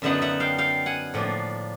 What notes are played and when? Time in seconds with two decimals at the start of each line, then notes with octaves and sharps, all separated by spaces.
0.02 F#2 D3 F#3 B3 D#4 E5 F#5
0.22 E5 F#5
0.40 F5 G5
0.58 F5 G5
0.86 F#5 G#5
1.14 A2 F3 A#3 D4